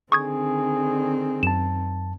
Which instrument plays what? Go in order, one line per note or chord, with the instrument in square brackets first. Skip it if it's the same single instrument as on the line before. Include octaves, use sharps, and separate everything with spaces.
[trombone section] D3 G#4 [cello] D#3 C4 [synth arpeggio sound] C#6 D#6 G#6
[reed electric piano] F#2 A5 [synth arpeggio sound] E7